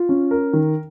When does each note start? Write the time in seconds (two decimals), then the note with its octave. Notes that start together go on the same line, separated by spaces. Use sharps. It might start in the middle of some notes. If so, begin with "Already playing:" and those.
Already playing: F4
0.09 C#4
0.31 A#4
0.53 D#3